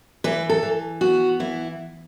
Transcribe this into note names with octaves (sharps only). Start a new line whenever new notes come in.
E3 B4
A4
E3
B3 F#4
E3 E4